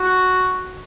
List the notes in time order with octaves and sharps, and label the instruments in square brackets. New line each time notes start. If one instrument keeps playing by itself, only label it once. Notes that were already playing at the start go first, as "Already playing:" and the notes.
Already playing: [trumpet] F#4